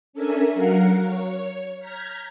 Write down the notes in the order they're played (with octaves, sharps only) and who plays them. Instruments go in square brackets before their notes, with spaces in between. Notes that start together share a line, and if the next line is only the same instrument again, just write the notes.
[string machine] C#4 D4 A4 A#4 E5 G#5
F#3 A#4 F5 F#5 A#5
C#5
A#5 F6 G6 G#6 B6